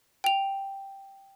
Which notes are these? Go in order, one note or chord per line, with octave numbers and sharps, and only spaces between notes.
G5 F7